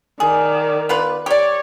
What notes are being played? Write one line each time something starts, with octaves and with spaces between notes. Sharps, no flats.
D#3 G#4 D5
B3 F4 B4
G4 C#5 D5